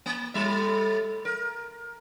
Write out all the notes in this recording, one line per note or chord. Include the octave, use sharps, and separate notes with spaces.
A#3
A2 G3 E5
A#4